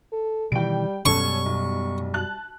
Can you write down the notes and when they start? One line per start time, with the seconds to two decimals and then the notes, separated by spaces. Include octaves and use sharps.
0.13 A4
0.52 B2 D#3 E3 G3 G5 D7
1.06 F#2 B2 G3 C#4 A4 C#5 C#6
1.46 B1
2.14 A5 F#6 F#7